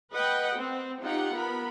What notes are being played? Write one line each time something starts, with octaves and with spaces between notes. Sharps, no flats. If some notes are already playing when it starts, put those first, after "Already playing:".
B4 D#5 F#5 G5
C4
D#4 F4 G4 F#5 G5
B3 A#4 B5